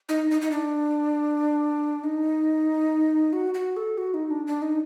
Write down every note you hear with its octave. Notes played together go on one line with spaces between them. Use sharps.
D#4
D#4
D#4
D4
D#4
F#4
F#4
A4
F#4
D#4
D4
D4
D#4